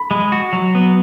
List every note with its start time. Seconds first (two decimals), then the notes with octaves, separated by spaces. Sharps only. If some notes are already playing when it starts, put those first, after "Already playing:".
Already playing: B5
0.11 G#3
0.32 F#4
0.53 F#3
0.75 B3